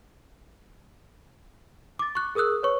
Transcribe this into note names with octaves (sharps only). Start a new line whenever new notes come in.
D6 A6
C#6 F#6
G#4 A#4 D#6 E6 F#6
B4 C#5 C#6